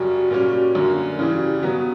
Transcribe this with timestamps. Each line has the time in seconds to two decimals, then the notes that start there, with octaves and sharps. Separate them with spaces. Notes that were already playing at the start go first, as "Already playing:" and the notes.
Already playing: F#2 C#3 G3 F#4
0.31 A#2 G3 C#4
0.75 F#2 D3 A#3
1.19 C#3 E3 G3 E4
1.33 F#4
1.48 G4
1.62 C#3 F#3 B3 F#4